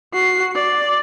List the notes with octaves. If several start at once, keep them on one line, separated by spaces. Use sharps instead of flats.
F#4 C7
D5